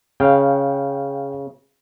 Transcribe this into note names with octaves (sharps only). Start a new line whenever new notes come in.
C#3 F5 G5